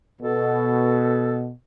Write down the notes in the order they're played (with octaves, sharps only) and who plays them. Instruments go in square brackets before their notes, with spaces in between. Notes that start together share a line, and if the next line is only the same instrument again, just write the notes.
[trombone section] B2 [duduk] A4